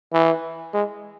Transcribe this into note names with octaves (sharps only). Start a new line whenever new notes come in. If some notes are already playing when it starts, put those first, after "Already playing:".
E3
G#3